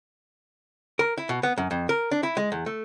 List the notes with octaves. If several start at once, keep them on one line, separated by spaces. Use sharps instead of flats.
A#4
E4
B2
B3
F#2
F2
A#4
D4
E4
G#3
E2
A3